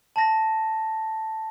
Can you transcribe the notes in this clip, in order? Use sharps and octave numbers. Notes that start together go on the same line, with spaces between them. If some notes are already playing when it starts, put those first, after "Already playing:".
A5 A#6